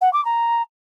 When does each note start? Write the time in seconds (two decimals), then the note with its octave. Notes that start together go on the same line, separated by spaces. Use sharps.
0.01 F#5
0.13 D6
0.25 A#5